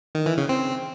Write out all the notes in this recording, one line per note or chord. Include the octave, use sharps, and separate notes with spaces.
D#3
E3
C#3
C4